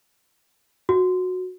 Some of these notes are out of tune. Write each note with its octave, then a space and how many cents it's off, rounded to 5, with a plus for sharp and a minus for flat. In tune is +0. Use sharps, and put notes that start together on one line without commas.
F#4 -15